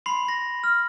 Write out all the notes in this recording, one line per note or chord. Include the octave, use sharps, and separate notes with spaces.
B5 C6 C7 F#7
A#6
F6